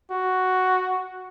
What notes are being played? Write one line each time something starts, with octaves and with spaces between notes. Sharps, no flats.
F#4